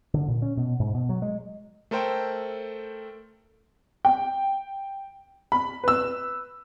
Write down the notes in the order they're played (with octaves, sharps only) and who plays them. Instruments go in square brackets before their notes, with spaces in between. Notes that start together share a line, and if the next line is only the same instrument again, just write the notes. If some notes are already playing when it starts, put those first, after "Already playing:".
[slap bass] D3
A#2
C#4
B2
G#2
B2
F#3
G#3
[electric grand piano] A3 A4 A#4 C5 G5
[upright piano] G5
B5
B4 E6